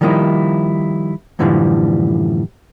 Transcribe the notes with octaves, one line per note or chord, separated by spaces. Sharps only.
D#3 F3 G3 A#3 D#4 E4
F#2 A2 D3 E3 F3 G3